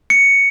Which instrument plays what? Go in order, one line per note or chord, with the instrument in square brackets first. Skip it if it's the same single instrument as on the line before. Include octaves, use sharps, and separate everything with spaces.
[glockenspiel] C#7